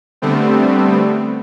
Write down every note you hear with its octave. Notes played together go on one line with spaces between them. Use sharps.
D3 G3 A3 B3 C4